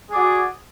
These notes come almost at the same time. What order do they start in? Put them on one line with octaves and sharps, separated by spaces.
G#4 D5 F#4